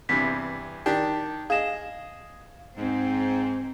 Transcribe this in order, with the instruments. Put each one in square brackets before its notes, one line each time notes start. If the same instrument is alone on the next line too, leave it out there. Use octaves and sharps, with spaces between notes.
[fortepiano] E2 G2 C3 [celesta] B6
[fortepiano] D#3 D4 G4
[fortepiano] G#4 D#5 [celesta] F5 E7
[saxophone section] G#2 [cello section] C4